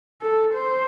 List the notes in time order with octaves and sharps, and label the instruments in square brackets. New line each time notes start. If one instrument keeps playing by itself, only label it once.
[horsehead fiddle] A4
C5